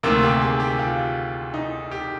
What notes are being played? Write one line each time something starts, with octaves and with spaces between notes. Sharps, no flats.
D2 C3 D#3 A#3 C4
G4
G#4
G4
F4
D#4
G4